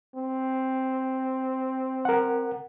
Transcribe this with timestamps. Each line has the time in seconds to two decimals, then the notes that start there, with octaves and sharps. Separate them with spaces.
0.16 C4
2.05 A#4 F#5